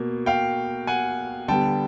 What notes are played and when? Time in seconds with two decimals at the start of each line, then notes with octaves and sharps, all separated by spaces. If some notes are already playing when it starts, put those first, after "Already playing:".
Already playing: B2 A#3
0.26 F5 G5
0.87 F#5 G#5
1.48 D3 G3 B3 G5 A5